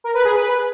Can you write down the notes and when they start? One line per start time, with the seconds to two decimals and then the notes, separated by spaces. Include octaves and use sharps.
0.04 A#4
0.14 B4
0.25 G#4
0.35 B4